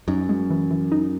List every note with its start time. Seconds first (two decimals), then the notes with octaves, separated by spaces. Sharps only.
0.08 F#2 D#4
0.29 G#3
0.50 E3
0.71 E3
0.92 D#4